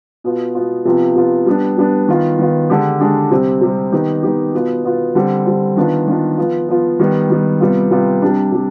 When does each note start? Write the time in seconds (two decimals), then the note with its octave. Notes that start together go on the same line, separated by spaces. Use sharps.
0.24 B2 B3 F4
0.55 B2 B3 F4
0.85 C3 F3 B3 F4
1.16 C3 F3 B3 F4
1.46 G3 B3 D4
1.77 G3 B3 D4
2.08 D#3 B3 F4
2.39 D#3 B3 F4
2.70 D3 G#3 D4 G4
3.00 D3 G#3 D4 G4
3.30 C3 G3 C4
3.61 C3 G3 C4
3.92 D#3 B3 D#4 G4
4.23 D#3 B3 D#4 G4
4.54 B2 B3 F4
4.84 B2 B3 F4
5.15 D3 G3 C4
5.46 D3 G3 C4
5.76 D#3 B3 D4 F4
6.08 D#3 B3 D4 F4
6.37 F3 B3 F4
6.69 F3 B3 F4
6.99 D#3 G3 B3
7.30 D#3 G3 B3
7.60 C3 G3 B3 F4
7.91 C3 G3 B3 F4
8.22 C3 G3 D4
8.52 C3 G3